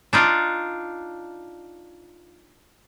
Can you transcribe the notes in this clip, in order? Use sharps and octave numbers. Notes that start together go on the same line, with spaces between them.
D4 D#4 F4